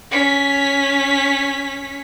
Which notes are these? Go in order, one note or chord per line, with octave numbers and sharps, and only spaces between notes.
C#4 B6